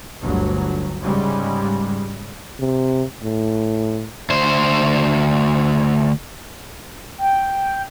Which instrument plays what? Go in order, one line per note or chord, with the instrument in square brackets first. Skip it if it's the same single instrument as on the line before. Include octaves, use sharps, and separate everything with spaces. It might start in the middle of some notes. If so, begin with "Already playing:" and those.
[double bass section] G1 D2 F#3
G#2 C#3 G3 G#3
[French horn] C3
A2
[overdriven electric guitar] D2 C5
[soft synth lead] G5